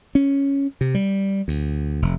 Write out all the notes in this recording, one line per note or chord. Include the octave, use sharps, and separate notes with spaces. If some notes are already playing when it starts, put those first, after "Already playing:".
C#4
C3
G3
D2
F1